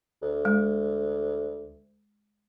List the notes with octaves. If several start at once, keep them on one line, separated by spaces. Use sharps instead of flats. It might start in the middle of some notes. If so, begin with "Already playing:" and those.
D2
G#3